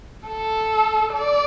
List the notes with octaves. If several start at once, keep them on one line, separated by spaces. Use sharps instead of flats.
A4
D5